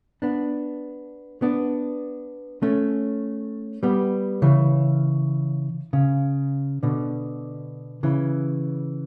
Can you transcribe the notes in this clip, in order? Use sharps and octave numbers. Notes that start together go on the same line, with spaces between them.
B3 D4
B3 D4
A3 C#4
G3 B3
C#3 E3
C#3
B2 D3
C#3 E3